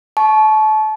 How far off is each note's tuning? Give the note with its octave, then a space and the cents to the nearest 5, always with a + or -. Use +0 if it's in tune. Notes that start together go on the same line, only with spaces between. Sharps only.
A5 -30 C#6 +0